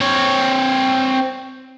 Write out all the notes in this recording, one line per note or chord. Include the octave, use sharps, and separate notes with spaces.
C4 C#5